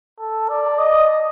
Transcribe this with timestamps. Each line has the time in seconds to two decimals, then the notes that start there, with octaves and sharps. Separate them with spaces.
0.19 A4
0.49 D5
0.78 D#5